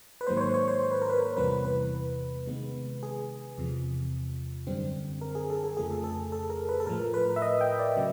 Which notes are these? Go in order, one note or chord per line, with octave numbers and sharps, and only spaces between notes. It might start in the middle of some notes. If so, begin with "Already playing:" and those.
B4
G#2 D#3 F#3 A#3 C5
C#5
C5
C#5
C5
C5
B4
A#4
B4
E2 C3 E3 G3 B3 B4
B4
C3 D#3 G#3 B3
G#4
E2 C3 F3
F#2 D3 G3 C4
A#4
G#4
A4
G#4
F2 C#3 F3 A3 G#4
A4
A4
A4
A#4
B4
A4
A2 F3 A3 A#4
B4
E5
D#5
G5
D5
C#3 F#3